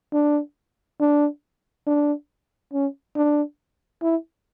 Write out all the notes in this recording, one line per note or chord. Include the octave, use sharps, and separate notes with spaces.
D4
D4
D4
C#4
D4
E4